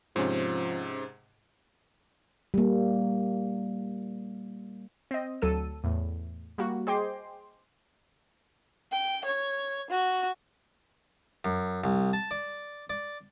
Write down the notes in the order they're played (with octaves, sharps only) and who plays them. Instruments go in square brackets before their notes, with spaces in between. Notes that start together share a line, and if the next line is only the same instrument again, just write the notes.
[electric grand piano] G#2 C3 [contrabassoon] F3 [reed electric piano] C#4 C5
[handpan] G3 A#3
[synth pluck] C4 D#5
D2 F#3 A4 E6 D#7
E2 A2
G3 A#3 F#4
G#4 C5 D#5 G5 C6 D6
[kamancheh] G5
C#5
F#4
[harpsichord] F#2
C2
A5
D5
D5